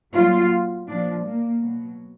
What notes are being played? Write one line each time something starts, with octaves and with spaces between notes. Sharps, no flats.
A#2 F#3 F4
A#2 F3 D4
A#3
B2 F#3